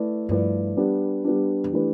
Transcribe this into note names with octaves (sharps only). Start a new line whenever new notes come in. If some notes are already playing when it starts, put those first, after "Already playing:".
Already playing: A3 E4 B4 D5
G2 F3 A3 E4 B4 D5
G3 B3 D4
G3 B3 D4
E2
E3 A3 D4 G4 B4